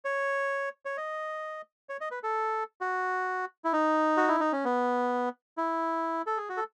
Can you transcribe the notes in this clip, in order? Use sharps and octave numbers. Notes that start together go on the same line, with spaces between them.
C#5
C#5
D#5
C#5
D#5
B4
A4
F#4
E4
D#4
F#4
E4
D#4
C#4
B3
E4
A4
G#4
F#4
A4